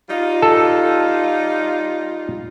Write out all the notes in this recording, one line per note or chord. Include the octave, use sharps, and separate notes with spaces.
G3 D#4 F4
A4